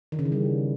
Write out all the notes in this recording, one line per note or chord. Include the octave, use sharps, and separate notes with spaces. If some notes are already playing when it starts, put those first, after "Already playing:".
D#3
C#3
E3
G3